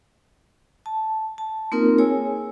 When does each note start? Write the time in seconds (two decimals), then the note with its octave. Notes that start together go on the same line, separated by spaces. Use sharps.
0.86 A5
1.38 A5
1.72 A#3 C4 D#4 F4 A#4
1.98 G#4 C#5 G#5 E6